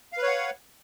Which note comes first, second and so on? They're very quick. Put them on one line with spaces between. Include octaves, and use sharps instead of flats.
F5 B4 C#5 F#5